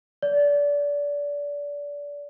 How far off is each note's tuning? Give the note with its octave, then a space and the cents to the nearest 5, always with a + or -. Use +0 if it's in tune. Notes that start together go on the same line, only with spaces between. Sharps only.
D5 -25